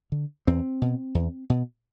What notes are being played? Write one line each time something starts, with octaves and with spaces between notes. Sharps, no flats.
D3
E2 C4
B2
E2
B2